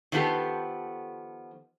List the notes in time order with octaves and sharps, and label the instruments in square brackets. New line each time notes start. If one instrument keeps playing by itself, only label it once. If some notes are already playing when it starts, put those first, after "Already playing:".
[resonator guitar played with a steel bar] D#3 F3 B3 G4 A4